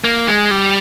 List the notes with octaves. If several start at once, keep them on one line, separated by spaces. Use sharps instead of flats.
A#3
G#3
G3